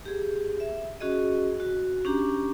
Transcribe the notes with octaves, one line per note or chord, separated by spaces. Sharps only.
G4 G#4
E5
C#4 F#4 G#4 D#5
F#4
C#4 D4 G4 A#5 D6